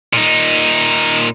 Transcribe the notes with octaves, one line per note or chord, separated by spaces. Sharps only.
A#2 D#4